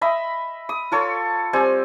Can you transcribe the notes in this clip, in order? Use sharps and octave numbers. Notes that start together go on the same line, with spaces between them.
D#5 E5 B5 D#6
D#6
F4 A4 C#5
G3 C4 G#5